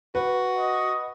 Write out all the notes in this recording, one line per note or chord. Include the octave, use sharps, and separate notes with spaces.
F#4 B4
D#5